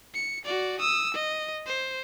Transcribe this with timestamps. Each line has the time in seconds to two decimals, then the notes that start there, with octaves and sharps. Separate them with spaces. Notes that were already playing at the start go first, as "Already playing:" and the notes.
0.14 C#7
0.46 F#4 D5
0.80 D#6 E6
1.14 D#5
1.66 C5